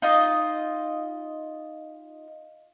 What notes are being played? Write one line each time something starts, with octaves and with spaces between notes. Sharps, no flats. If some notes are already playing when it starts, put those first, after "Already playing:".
D#4 F4 D#5